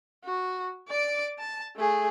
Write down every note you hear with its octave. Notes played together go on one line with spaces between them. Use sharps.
F#4
D5 D6
A5
A3 G#4